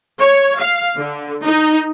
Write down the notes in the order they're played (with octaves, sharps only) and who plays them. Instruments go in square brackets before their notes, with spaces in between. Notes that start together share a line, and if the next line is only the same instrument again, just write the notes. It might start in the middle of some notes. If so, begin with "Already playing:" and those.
[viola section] C#5
F5
D3
D#4